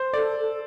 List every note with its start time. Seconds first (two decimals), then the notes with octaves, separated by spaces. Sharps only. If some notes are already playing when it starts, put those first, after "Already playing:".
Already playing: C5
0.13 A4 D5
0.36 A4